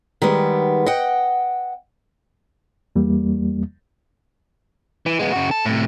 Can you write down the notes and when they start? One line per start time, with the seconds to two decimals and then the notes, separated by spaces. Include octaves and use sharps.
0.22 D#3 G3 G#3 B3
0.86 D#5 F#5 G5
2.96 E2 G3 A#3
5.06 E3
5.19 G#3 B3
5.33 C#3 F#4
5.51 A4
5.66 A2 C3